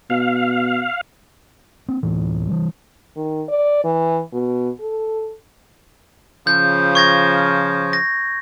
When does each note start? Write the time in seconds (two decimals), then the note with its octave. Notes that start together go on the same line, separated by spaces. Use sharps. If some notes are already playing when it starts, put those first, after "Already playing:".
0.10 B2 F5
1.88 A#3 C4
2.03 D1 A2 E3
2.48 E3 G3
3.16 D#3
3.48 D5
3.84 E3
4.33 B2
4.81 A4
6.47 C#3 F3 G6
6.95 C#6 G#6 A#6
7.93 A#6